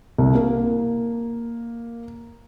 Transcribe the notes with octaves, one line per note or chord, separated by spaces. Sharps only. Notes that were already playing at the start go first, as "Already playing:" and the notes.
C2
A#3